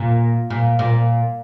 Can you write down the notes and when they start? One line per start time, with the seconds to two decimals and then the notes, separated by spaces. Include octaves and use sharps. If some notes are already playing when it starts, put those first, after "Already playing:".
Already playing: A#2
0.50 A#2
0.79 A#2